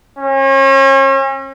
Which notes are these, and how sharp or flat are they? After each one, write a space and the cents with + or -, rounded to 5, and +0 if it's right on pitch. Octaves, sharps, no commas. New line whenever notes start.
C#4 -40